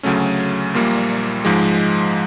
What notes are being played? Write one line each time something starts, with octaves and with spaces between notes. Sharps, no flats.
D2 C#3 F#3 A3 C#4
A#1 A#2 G3 A#3
G#2 F3 G#3